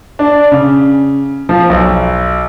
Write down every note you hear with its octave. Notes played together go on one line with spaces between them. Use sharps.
D4
C#3
F3
B1